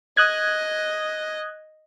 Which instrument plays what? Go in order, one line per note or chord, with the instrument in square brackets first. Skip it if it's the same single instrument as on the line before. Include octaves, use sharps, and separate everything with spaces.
[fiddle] D#5 [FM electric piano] D#6 F#6 G#6